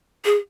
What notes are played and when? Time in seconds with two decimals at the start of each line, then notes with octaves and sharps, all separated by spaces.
0.25 G#4